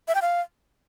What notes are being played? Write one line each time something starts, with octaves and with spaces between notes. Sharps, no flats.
E5
G5
F5